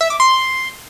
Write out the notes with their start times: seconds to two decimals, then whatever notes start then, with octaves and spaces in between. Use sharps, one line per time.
0.01 E5
0.10 D6
0.20 C6